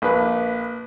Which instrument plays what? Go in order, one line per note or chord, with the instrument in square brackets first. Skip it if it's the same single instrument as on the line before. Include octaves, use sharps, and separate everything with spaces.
[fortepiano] A#1 B4